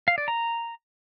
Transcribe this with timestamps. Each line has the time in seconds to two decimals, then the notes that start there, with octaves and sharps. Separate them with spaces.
0.08 F5
0.18 D5
0.28 A#5